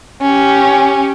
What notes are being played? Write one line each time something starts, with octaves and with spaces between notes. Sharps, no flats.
C#4 G4